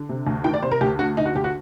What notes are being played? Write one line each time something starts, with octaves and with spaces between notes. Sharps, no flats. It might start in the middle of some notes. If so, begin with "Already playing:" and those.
Already playing: D3
C3
D2
D#3 G5
D5
C3 C5
A#4
D2 G4
D3 F#4
D2 D#4
F#4
D2 G4
F#4